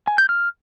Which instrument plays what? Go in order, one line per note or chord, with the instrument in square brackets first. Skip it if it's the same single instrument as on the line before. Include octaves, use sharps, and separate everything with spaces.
[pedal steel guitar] G#5
G6
F6